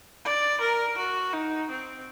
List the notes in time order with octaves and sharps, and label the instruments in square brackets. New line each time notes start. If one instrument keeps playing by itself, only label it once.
[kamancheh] D5
A#4
F#4
D#4
C4